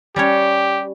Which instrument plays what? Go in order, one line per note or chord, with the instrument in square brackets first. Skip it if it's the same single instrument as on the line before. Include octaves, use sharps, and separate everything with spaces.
[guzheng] G3 C#4 C#5 [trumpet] G4